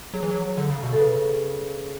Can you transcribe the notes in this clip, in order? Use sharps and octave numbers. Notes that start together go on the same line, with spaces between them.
F#3 G#4
E3
F#3
D3
C#3
B2
A4
C#3 B4